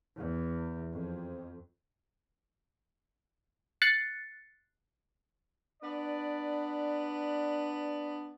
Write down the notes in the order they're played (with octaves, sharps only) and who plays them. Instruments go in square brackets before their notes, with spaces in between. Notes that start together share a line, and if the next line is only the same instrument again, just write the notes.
[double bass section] E2
F2
[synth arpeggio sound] F#6 A6 C7 C#7
[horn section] B3 D4 B4 D5